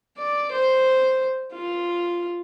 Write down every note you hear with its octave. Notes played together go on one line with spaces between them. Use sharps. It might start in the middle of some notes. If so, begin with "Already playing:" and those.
D5
C5
F4